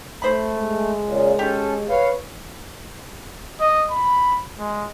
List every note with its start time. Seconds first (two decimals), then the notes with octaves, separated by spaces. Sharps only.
0.22 A3 C5 B5
0.56 G#3
1.04 A#2 C#3
1.39 C#4 G4 A4
1.89 B4 C#5 F5
3.60 D#5
3.91 B5
4.58 G#3